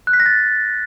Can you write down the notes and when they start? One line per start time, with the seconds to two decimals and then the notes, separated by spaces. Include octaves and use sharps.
0.07 F#6
0.13 B6
0.20 A#6
0.26 A6